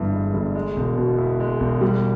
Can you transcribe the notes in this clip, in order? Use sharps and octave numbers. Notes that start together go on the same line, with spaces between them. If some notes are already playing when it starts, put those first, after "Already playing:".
Already playing: G1 G2 E3
G#3
G1
G#3
E1
B2
E2
G#3
E1
G3